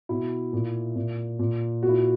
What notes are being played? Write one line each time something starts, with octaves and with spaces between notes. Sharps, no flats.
B2 E4
A#2
A#2
A#2
A#2 F#4
E4